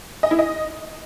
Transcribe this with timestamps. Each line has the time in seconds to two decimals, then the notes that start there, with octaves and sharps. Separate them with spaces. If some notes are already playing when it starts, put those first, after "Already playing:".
0.23 D#5
0.31 E4
0.39 D#5